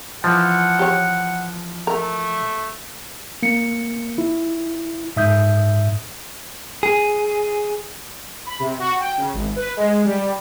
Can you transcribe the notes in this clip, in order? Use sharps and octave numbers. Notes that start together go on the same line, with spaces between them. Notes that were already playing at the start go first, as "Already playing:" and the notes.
E3 F3 F#5
G4 C#5
A3 A#4
A#3 C#7
E4
G#2 E5 D#6 G6
G#4
B5
C3
F#4
G5
C#3
G#1
B4
G#3
G3